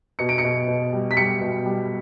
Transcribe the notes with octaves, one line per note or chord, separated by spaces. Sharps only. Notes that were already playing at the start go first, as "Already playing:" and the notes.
B2 C#7
D7
C#7
B2
B2
G3
B6
G3 C#7
B2
G3